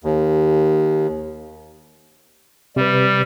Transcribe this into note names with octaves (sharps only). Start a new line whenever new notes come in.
D#2
C3 G3 B4